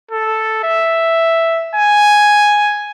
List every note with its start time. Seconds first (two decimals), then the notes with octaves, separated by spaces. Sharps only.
0.11 A4
0.64 E5
1.75 G#5